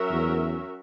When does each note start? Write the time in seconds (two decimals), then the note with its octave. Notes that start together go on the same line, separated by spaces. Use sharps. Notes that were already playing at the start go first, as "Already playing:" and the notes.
Already playing: F#3 C#4 F#4 A#4 E5
0.11 E2